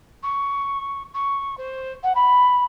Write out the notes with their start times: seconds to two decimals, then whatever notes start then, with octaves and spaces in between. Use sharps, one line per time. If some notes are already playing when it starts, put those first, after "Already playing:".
0.23 C#6
1.14 C#6
1.57 C5
2.03 F#5
2.15 B5